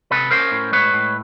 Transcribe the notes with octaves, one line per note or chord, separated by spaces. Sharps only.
C3 A4 B4
C#4 A#4 C5
A2
G#3 B4 C#5
A2